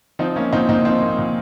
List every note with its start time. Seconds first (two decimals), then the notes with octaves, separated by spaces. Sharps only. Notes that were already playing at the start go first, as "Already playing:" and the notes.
0.19 F3 C4 D#4
0.36 A#3 C#4
0.52 A#2 C4 D#4
0.68 A#2 C4 D#4
0.85 F3 C4
1.01 A#3
1.18 A#2